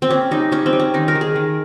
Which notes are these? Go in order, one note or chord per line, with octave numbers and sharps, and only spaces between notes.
C4
A#3 C#4
G3 D#4
G3 C#4
C4
G3
C#4
D#3 D#4
A#4
D#3
G#4
D#3